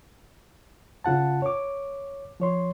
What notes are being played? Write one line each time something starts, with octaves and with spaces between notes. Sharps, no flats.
C#3 F4 F#5 A5
C#5 D6
F3 C#5 C6